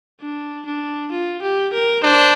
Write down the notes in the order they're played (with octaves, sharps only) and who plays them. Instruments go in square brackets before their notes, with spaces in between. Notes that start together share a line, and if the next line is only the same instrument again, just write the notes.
[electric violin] D4
D4
F4
G4
A#4
[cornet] D4 [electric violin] C5